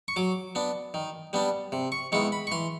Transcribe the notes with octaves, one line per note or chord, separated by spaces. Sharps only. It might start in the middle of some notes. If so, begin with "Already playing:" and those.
C#6
F#3 D6
B3 D4
D#3
G3 B3 D4
C3
C#6
D#3 G#3 B3 E4 C#6
B5
C#6
E3 C6